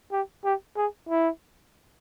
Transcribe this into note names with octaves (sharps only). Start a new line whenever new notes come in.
G4
G4
G#4
E4